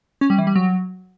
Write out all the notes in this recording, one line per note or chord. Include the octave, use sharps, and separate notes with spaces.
C#4
G3
E3
G3
F#3